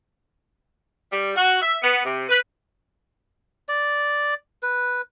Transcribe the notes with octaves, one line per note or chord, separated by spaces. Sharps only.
G3
F#4
E5
B3
C3
B4
D5
B4